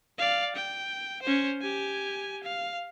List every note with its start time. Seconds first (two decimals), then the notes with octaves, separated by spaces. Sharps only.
0.18 D5 F5
0.56 G5
1.22 C#4 C5
1.61 G4 G#5
2.43 F5